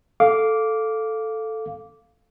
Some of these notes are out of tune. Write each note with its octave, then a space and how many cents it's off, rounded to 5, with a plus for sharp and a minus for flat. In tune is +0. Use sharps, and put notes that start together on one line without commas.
A4 +0 F5 +0 D6 -10